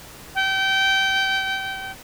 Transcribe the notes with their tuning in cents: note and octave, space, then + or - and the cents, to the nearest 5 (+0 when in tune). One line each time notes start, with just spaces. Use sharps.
G5 -25